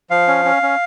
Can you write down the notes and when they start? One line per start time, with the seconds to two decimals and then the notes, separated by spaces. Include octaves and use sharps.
0.10 F3 F5
0.28 C#4
0.45 C#4
0.63 C#4